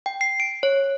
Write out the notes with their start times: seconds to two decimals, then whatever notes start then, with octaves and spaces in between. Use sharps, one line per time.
0.06 G5
0.21 C7
0.40 D7
0.63 C#5